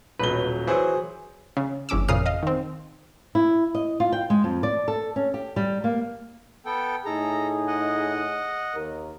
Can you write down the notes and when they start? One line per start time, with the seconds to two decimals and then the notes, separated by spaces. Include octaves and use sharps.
0.19 D#1 B1 F#3 B4 G7
0.67 E3 F#3 G#4 C5
1.57 C#3
1.89 G1 E2 C#4 D6 E6
2.08 F2 A#2 C#3 D#6 F6 C7
2.26 D#5 F5
2.43 D#3 C4
3.35 E4
3.75 D#5
4.00 F4
4.12 G5
4.30 G#3
4.44 F2
4.63 D5
4.88 A4
5.16 C#4
5.34 G4
5.56 G3
5.84 A#3
6.65 B3 A4 G5
7.06 A2 D#4 G#4 A4 A#5
7.67 D#5 F#5
8.75 D#2 A#4